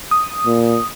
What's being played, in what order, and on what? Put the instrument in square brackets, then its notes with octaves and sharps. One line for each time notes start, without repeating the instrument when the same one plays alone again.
[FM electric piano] D#6
[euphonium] A#2